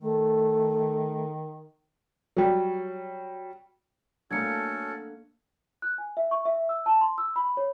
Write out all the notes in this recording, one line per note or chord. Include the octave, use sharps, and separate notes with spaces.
D#3 A3
F#3 G3
A3 A#3 C#4 D4 F#4 A4 G#6 C#7
F#6
G#5
E5
C#6
E5
E6
A5
C6
E6
B5
C#5